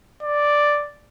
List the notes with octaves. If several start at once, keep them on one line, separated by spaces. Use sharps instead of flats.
D5